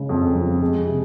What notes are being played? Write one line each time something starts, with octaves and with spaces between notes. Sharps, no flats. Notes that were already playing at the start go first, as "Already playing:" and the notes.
Already playing: C#3 G#3
F2
F3
G#3
C3